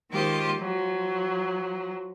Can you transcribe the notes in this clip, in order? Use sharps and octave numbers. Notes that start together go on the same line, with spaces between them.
D#3 G#3 F4 G4 C5
F3 F#3